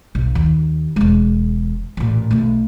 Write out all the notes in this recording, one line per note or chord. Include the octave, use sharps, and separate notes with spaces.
B1
D#2
E1 G#3
A1 A#2
B1 A3